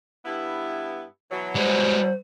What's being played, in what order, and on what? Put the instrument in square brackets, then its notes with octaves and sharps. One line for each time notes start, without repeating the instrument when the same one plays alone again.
[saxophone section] G2 B3 E4
B2 E3 F#3
[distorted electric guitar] G3 G#3 [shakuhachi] C5